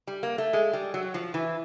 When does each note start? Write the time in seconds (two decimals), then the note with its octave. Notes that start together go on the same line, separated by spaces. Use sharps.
0.07 G3
0.23 A#3
0.38 A3
0.53 G#3
0.73 G3
0.94 F#3
1.14 F3
1.34 E3